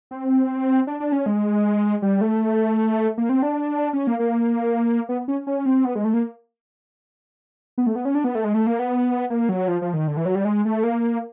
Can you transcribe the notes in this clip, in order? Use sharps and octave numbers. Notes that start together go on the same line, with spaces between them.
C4
D4
D4
C#4
G#3
G3
A3
A#3
C4
D4
C#4
A#3
A#3
B3
C#4
C#4
C4
B3
G#3
A3
A#3
B3
A3
B3
C#4
D4
B3
A3
G#3
A3
A#3
B3
A#3
F#3
F3
F3
D#3
D3
E3
F#3
G3
G#3
A3
A#3